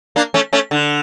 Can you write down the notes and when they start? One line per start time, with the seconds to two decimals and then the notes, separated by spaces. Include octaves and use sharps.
0.16 A#3 D4
0.34 A3 C#4
0.53 A3 C#4
0.71 D3